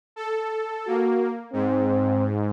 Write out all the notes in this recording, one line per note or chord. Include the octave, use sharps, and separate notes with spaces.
A4
A#3 F#4
G#2 C4